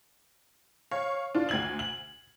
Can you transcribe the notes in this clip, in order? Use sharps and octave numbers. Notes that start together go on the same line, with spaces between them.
C#5 F5
D4 F4
D2 G#6 F#7
F#7